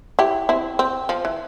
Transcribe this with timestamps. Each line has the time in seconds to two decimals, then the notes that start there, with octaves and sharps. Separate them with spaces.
0.19 E4 G4
0.49 C4 E4
0.79 C4
1.09 F3
1.25 E3